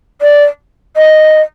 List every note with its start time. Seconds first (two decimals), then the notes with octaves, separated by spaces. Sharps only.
0.21 D5
0.96 D#5